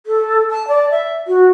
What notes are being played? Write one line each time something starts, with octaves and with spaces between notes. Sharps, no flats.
A4
A5
D5
E5
F#4